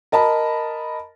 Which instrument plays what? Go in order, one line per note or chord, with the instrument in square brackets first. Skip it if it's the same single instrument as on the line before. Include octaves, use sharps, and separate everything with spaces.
[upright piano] A#4 D#5 A5 B5